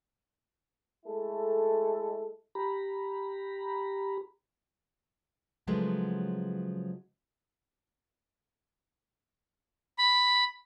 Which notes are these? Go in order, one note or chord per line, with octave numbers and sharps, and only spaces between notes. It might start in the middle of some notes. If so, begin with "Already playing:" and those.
G#3 A3 E4 A4
G4 A#5 B5
C#3 F3 F#3 G#3 A3 B3
B5